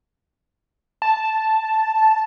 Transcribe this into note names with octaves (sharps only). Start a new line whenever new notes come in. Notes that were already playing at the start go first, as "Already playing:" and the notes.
A5